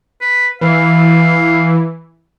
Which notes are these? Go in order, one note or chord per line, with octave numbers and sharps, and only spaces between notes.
B4
E3 F5